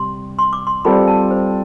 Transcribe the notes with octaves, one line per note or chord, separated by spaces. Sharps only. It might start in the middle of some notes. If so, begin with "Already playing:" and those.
Already playing: C3 G3 C6
C6
D6
C6
G3 C4 F4 A4 D5 B5
A5
C5